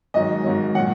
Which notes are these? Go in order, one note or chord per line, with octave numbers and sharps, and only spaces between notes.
G#2 D#3 F#3 D#5
G#2 D#3 F#3
A#2 F#3 F#5